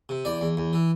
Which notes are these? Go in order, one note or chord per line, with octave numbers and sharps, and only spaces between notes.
C3
E2 D5
E2
E2
E3